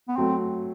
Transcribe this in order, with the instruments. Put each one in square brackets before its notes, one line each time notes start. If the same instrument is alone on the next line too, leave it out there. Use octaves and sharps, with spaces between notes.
[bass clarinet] B3
[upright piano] F#3 A3 [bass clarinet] C4